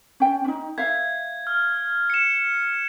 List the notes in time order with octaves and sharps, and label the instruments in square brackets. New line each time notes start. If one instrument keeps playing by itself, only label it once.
[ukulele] C#4 G5
C#4 D#4
[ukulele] E5 F5 [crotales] G#6
[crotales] F6
C#7 E7